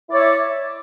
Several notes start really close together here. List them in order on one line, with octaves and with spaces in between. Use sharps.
E4 D5 C#5 E5